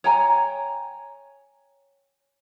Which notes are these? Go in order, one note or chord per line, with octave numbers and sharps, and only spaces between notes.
C#5 G5 G#5 A#5